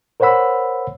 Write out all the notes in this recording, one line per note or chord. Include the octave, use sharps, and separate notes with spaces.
A#4 C5 C#5 F#5 B5 E6